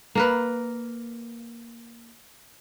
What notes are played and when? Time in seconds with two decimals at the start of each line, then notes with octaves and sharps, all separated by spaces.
0.15 A#3 A#4 B4